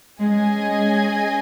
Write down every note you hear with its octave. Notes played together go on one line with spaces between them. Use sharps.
G#3 C#4 G#4 D#5 G#5
G#3